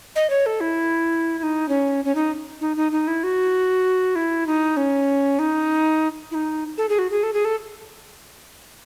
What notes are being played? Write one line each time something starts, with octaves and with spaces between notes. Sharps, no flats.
D#5
C#5
A4
E4
E4
D#4
C#4
C#4
D#4
D#4
D#4
D#4
E4
F#4
E4
D#4
C#4
D#4
E4
D#4
A4
G#4
F#4
G#4
A4
G#4
A4